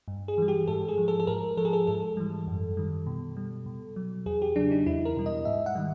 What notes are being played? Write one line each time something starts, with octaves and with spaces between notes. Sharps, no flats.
G2
G#4
E3 G3
G4
G#2 A4
G#4
F3
A4
A4
G#2 A#4
F3 A4
G#4
A4
G#2 A4
E3 G3
F#2
D#3 G3
B2
G3
B2
F#3
E2 G#4
G4
C#3 F#3 D4
D#4
E2 E4
A#4
B2 G3
D#5
G#2 E5
F#5
D#3 G3